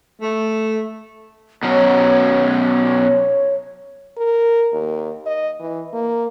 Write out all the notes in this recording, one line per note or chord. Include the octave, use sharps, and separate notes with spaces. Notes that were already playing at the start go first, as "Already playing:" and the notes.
A3
B2 F#3 C#4 C#5
A#4
D#2
D#5
E3
A#3